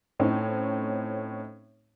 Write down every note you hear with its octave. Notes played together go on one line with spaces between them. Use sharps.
A2 C4 C#4 D#4